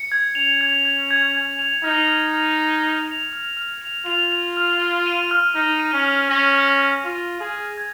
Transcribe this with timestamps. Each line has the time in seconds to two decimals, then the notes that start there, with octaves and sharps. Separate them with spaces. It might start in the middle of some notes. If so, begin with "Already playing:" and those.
Already playing: C#7
0.12 G#6
0.35 C#4 F7
0.61 G#6
0.85 G#6
1.11 G#6
1.35 G#6
1.59 F7
1.84 D#4 F6
2.08 F6
2.34 F6
2.58 A#6
2.84 F6
3.08 F7
3.33 F6
3.57 F6
3.82 F7
4.06 F4 F7
4.32 F7
4.57 F6
4.82 F6
5.06 D#7
5.31 F6
5.55 D#4 F6
5.80 D#7
5.93 C#4
6.04 F6
6.29 C#4 A#6
6.55 F6
6.79 F6
7.03 F4 F6
7.28 A#6
7.40 G#4
7.53 F6
7.78 G#6